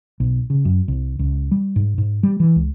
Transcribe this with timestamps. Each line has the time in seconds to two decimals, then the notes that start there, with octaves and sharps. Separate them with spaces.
0.20 B1
0.50 C#3
0.65 F#2
0.88 C2
1.19 C#2
1.51 G3
1.76 G#2
1.98 G#2
2.23 G3
2.40 E3
2.56 C#2